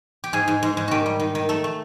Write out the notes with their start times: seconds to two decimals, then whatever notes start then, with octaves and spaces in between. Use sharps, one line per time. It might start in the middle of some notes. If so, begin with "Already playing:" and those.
0.24 G4
0.33 G#2 G#4
0.48 G#2
0.63 G#2
0.77 G#2
0.88 D#3 F#4 G4
1.06 G3
1.20 D#3
1.35 D#3
1.49 A3 A4
1.64 A3